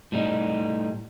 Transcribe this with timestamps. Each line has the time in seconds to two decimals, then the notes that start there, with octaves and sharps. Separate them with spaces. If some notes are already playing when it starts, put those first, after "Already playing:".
0.12 A2 G3 D#4